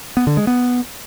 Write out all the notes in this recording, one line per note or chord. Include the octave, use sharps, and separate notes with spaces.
B3
D3
G#3
B3